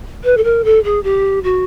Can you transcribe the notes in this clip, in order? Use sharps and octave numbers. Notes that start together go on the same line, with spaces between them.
B4
A4
A#4
A4
G#4
G4
F#4